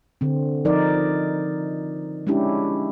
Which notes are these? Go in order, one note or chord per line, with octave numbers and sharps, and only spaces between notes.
D3 C4
F3 D#4 A#4 D5
G#3 C#4 D4 E4 G4